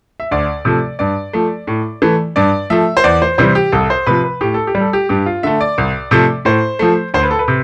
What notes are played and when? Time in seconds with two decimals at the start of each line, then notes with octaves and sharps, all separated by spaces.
0.20 E5
0.31 D2 D5
0.65 C3 F3 A3
0.99 G2 D5
1.33 F3 A3
1.67 A2
2.02 E3 A3
2.36 G2 D5
2.70 F3 A3 E5
2.97 C5
3.04 E2 D5
3.22 C5
3.38 C3 E3 G3 C5
3.55 G4
3.72 C2 A4
3.90 C5
4.07 C3 F3 B4
4.24 B4
4.41 A2 G4
4.54 A4
4.67 G4
4.75 G3
4.80 A4
4.93 G4
5.09 G2 G4
5.26 F4
5.43 D3 A3 E5
5.61 D5
5.78 C2
6.11 C3 F3 A3
6.45 A2 C5
6.79 F3 A3
7.14 D2 C5
7.23 B4
7.31 A4
7.39 B4
7.48 C3